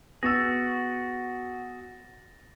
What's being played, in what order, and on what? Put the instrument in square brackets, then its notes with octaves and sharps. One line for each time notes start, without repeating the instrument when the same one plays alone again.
[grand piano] B3 E6 [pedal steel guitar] F#4 G#4 [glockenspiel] A6 A#6